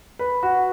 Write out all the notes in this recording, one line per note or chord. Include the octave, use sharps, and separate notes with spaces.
B4
F#4